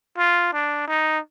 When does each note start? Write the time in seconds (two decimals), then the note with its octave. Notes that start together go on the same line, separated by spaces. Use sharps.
0.18 F4
0.53 D4
0.87 D#4